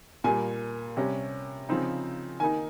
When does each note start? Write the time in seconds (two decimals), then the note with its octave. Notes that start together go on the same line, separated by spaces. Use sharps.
0.24 A#2 G3 A#3 G#5
0.97 C3 G3 C#4
1.69 C#3 F3 C4 D#4
2.40 D#3 A#3 D#4 G#5